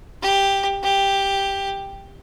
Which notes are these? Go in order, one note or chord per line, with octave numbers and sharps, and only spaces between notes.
G4
G4